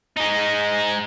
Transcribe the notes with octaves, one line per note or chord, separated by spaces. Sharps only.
G#3 D#4